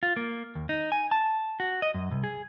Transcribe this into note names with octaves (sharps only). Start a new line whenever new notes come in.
F4
A#3
D#2
D#4
G#5
A5
F#4
D#5
F#2
C2
G#4